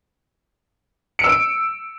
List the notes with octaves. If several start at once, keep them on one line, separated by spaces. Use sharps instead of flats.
E6 C#7 D7